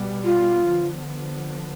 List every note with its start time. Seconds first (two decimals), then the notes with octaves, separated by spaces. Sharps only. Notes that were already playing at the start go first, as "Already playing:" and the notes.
Already playing: B2 G3 B3
0.24 F4
0.66 D3 F3 B3